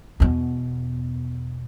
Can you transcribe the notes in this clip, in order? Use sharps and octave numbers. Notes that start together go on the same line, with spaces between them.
E2 B2